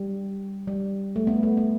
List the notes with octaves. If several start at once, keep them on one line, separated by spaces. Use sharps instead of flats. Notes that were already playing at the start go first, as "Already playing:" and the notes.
Already playing: G3
G3
A3
B3
A3
B3